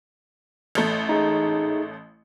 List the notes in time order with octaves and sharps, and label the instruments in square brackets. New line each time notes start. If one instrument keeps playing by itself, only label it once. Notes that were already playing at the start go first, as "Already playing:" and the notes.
[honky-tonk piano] A1 A3
[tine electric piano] D#4 G#4